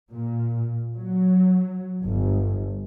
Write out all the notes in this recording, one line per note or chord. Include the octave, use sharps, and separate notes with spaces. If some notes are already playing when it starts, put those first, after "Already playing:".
A#2
F#3
G1